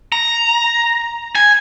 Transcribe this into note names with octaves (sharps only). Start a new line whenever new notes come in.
A#5
G#5